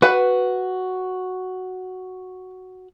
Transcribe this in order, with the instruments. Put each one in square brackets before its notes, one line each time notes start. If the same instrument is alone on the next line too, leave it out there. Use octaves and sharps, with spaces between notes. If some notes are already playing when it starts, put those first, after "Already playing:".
[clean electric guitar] F#4 [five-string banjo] B4 F#5